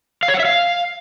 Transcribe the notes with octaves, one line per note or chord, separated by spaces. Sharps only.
F5
C#5
F#5
E5
F5